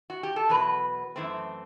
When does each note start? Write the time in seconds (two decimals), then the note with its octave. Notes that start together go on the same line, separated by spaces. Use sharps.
0.10 F#4
0.23 G4
0.36 A4
0.49 E2 B2 F#3 B3 B4
1.16 F#2 E3 A3 C4